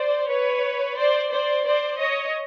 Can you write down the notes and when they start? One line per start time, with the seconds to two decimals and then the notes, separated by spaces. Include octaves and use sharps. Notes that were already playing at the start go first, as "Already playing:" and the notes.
Already playing: C5 D5
0.29 B4 C#5
0.97 C5 D5
1.31 C5 D5
1.66 C5 D5
2.00 C#5 D#5